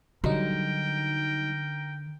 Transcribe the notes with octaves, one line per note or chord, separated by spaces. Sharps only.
D3 F#3 G3 D#4 A#4 G5